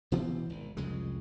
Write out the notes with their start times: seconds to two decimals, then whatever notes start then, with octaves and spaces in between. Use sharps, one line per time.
0.12 B2 E3 B3 C4
0.50 G#1
0.77 C2 F2 C#3 G#3